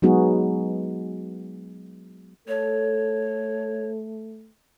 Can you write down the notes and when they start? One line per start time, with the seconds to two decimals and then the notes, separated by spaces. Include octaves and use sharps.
0.02 F#3 G#3 B3 D#4 F#4 G#4
2.48 A3 A4 C#5